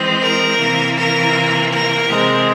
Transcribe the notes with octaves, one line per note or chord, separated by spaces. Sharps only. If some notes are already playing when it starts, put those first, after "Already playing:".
Already playing: E3 G#3 C4
A#4
C3 E3 A#3
A#4
A#4
C3 E3 G#3 C4